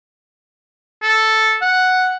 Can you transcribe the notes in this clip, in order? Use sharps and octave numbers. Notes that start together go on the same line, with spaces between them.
A4
F#5